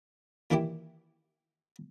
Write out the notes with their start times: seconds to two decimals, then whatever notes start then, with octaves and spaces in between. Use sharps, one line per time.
0.51 A#2 D#3 E3 E4 G4